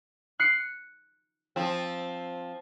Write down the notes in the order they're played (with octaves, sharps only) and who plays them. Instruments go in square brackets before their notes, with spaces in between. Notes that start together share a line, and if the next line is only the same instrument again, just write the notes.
[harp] F#6 C7 C#7
[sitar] F3 C4